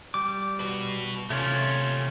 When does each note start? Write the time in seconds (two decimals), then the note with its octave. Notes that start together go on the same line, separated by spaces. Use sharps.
0.14 G3 D6
0.60 F#4 B4
1.30 C3 A3 C#4 F4 C#5